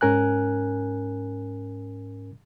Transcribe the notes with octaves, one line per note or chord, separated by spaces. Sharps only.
G#2 C#4 A#4 G#5 F#6